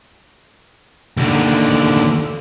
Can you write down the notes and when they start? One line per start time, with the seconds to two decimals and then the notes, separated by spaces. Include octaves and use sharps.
1.17 D#2 D3